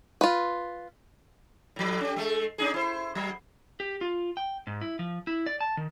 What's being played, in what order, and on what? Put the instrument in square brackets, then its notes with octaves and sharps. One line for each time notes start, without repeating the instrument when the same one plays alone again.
[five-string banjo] F4 B4
[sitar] A2 F3
C#4 G4
G#3 A3
C#4 D#4 G#4
E4 C5
F#3
[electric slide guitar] G4
F4
G5
G#2
E4
F3
E4
D5
A5
D#3